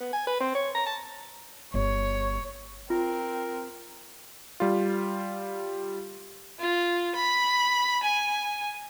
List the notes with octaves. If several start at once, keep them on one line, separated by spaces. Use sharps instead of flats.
B3
G#5
B4
C4
C#5
A#5
A5
G1 C#5
C4 F4 A#4
G3 F4
F4
B5
G#5